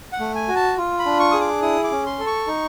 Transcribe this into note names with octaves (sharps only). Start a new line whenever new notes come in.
F#5
A3
G#5
F#4
A5
F4
B5
D4
C#6
G#4 D#6
D6
E4 D#6
D6
C#4
C6
A4
C#6
D#4